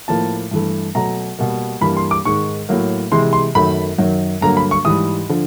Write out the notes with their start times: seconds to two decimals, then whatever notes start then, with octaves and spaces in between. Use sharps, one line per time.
0.08 A2 F3 A#3 A5
0.51 G2 E3 A3
0.95 B2 F#3 A3 A#5
1.39 B2 G3 A#3
1.81 G2 E3 G3 A#3 B5
1.97 C6
2.11 D6
2.25 G#2 D#3 G#3 C#6
2.69 A2 F#3 A#3
3.12 C3 E3 G#3 C6
3.33 C6
3.55 F#2 D#3 F#3 A3 B5
3.98 F#2 D#3 F#3
4.41 G2 D3 F#3 A#3 A#5
4.57 B5
4.71 C#6
4.85 G#2 E3 G3 D#6
5.29 D3 F3